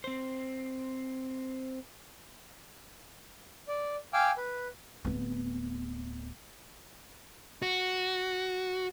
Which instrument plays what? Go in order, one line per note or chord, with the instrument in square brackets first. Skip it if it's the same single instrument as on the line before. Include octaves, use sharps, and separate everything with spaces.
[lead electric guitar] C4 C5
[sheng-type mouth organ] D5
F5 G5 G#5 D6 E6 F6
B4
[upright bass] D1 B3
[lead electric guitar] F#4